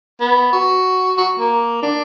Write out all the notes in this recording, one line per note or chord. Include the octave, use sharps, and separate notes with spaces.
B3
F#4
F#4
A#3
D4